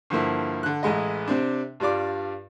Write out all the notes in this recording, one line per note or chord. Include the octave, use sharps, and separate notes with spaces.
G2 D3 F3 A#3 E4
D3 F#6
A1 E3 G#3 D#5
C3 C4 D4
G2 G3 F4 D5 D6